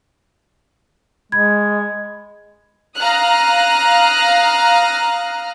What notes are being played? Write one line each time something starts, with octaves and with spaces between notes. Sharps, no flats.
G#3 B5 G#6
F5 A#5 D#6 F6 F#6